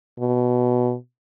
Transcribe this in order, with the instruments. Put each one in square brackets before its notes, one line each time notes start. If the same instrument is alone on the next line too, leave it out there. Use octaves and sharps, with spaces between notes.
[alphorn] B2